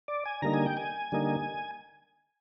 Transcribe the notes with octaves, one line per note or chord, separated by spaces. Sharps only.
D5
G#5
D3 G3 A#3 D#4 A#5
G#5
G5
G#5
D3 G3 A#3 D#4